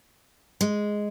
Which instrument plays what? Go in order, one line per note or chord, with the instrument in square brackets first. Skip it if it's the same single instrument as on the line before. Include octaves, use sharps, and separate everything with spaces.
[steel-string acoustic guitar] G#3